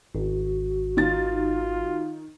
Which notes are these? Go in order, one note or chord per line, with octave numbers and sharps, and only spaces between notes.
G#1 F#4
D#3 F4 A6